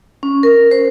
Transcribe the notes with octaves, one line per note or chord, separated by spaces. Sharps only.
C#4
A#4
C5